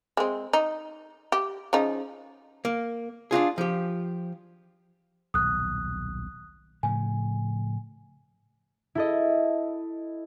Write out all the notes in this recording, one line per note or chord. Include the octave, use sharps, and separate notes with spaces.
G#3 C4
D#4
G4
C#3 F3 D#4
A#3
D4 D#4 F4 G#4
F3 G4
D#1 B1 D#6 F#6
A2 C#3 F3 G#5
E4 A4 D#5